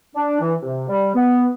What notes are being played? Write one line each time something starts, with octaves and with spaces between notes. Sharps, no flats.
D4
E3
C3
G3
B3